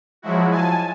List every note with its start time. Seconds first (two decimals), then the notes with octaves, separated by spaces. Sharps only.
0.22 F3 F#3 G#3 E4 F#4
0.51 G#5 A5